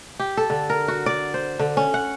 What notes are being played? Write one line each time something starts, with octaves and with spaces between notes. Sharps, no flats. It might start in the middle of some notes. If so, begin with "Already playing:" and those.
G4
A4
D3
A#4
F#4
D5
C5
D3
C#4
F#5